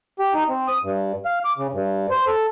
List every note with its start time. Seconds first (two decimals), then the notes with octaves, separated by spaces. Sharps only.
0.19 G4
0.34 D#4
0.49 C4
0.68 D#6
0.83 G2
1.25 F5
1.45 D6
1.58 C#3
1.73 G2
2.11 C5
2.27 A4